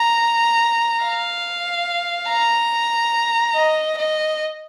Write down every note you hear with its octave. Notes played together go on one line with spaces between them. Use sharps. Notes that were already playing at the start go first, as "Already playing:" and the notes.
Already playing: A#5
F5
A#5
D#5
D#5